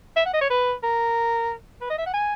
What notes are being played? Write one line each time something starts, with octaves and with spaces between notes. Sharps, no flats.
E5
F#5
D#5
C#5
B4
A#4
B4
D#5
E5
F#5
G#5